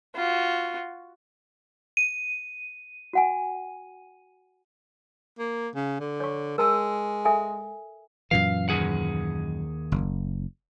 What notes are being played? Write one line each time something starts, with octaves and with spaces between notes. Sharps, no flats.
F4 F#4
D#7
F#4 F#5 G#5
A#3
C#3
D3
C#5 C#6
G#3 A#4 A5 E6
A4 E5 G#5
F#2 A#2 E3 F5
D#2 G#4 F#5
F#1